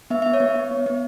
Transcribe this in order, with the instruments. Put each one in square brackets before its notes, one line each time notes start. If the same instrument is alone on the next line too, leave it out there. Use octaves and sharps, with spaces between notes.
[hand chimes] B3 E5
B3 E5
C#5
B3
B3
B3
B3